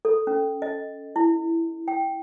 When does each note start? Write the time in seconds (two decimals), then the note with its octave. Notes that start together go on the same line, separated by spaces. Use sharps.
0.05 A4
0.27 C#4
0.62 D#5
1.16 E4
1.88 G5